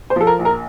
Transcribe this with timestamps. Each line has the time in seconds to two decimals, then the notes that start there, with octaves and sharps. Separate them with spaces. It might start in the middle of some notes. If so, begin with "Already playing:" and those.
0.10 C5
0.16 F3 A4
0.27 A#4
0.39 A#1
0.45 A#4